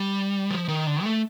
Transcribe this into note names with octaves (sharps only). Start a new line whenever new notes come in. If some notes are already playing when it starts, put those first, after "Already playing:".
Already playing: G3
F3
D#3
D3
A3